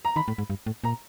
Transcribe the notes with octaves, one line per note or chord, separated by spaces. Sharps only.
A#5
D#3 B5
A2
G#2
G2
A2
A#2 A#5